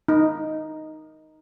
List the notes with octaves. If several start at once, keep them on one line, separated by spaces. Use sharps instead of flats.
D#4